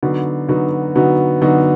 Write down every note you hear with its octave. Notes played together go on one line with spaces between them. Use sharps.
D3 F#3 B3 D#4 F#4
D3 F#3 B3 D#4 F#4
D3 F#3 B3 D#4 F#4
D3 F#3 B3 D#4 F#4